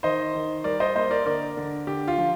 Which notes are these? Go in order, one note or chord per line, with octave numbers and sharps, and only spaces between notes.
D#3 C5 D#5
D#3
G3 A#4 D5
C5 D#5
A#3 C5 D#5
A#4 D5
D3 A#4 D5
D3
D3 G4
F4
F3